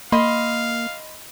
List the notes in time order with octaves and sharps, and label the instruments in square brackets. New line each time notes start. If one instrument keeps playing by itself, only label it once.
[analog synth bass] A#3 [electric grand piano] D#5 B5 C6 [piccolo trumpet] F5